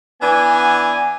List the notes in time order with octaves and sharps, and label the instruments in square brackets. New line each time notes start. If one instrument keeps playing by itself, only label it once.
[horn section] E3 B3 D4 G#5